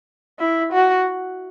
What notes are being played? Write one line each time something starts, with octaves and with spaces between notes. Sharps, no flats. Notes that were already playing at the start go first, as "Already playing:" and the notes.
E4
F#4